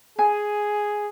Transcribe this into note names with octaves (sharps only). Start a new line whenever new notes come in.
G#4 G#5